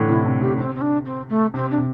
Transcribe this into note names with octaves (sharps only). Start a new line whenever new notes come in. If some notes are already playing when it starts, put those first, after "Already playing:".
Already playing: A2 D3 E3
C3 E4
C3
A2 G4
C3 C4
C4
D4
C4
A3
C3 C4
D4
C3